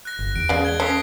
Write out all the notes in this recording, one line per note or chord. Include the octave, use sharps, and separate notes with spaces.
F#6 A#6
G1
E2 D7
C#3 G#3 D5
G#6 G7
C#4 A4 D#6 B6 C7